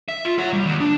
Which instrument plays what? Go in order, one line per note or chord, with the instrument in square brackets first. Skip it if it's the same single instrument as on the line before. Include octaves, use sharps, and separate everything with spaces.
[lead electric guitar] E5
F4
C#5 F#5
G3
D#2
D4